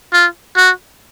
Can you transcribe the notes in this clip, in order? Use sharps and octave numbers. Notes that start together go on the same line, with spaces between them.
F4
F#4